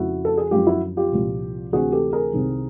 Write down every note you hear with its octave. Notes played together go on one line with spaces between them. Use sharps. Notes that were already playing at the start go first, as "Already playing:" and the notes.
Already playing: F2 C#3 F3 E4 F#4
A4
G#4
F#2 D3 F3 F4 G4
E4 F#4
F4 G4
C2 A#2 F3
D2 C3 E3 F#4 G#4
G4 A4
G#4 A#4
C2 C3 D#3